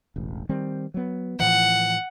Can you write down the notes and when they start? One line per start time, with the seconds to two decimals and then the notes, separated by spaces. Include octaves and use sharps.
0.16 E1 A1
0.49 D#3 G3 C4
0.94 F#3 B3
1.39 A2 E3 F3 F#5